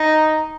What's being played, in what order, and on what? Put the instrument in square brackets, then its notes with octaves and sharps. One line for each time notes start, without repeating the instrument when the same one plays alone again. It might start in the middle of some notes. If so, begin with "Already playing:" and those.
Already playing: [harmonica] D#4